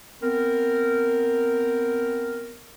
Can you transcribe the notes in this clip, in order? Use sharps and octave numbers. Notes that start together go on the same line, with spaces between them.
B3 C4 A#4